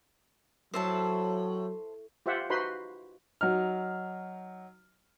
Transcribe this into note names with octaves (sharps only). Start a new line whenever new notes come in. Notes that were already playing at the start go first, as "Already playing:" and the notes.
A2 F#3 C5 E5 A5
F4 G4 C5 E5 F#5
D#4 F#4 B4 C5 B5 C6
F#3 D#4 F6